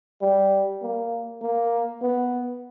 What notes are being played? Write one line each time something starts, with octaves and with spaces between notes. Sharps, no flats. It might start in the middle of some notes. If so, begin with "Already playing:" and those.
G3
A#3
A#3
B3